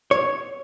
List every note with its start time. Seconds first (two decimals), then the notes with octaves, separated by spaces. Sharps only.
0.11 C#5